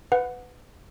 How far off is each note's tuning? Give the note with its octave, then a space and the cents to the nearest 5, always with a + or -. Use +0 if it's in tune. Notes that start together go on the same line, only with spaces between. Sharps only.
B4 +15 F#5 -20